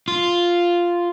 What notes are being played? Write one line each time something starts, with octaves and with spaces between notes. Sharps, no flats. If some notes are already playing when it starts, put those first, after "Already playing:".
F4